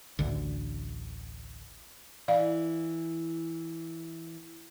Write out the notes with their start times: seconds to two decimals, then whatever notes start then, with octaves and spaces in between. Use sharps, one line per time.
0.19 A1 D2 D3
2.28 E3 D5 F5